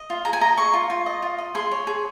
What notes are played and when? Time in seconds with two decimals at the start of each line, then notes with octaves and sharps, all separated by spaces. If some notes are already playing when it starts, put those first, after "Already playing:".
Already playing: D#5
0.10 F4
0.25 G#4 A#5
0.33 G#5
0.41 D#5 A#5
0.57 G#4 C#6
0.73 F4
0.90 F4
1.06 D#5
1.22 F4
1.38 D#5
1.55 G#4 C6
1.71 C#5
1.87 G#4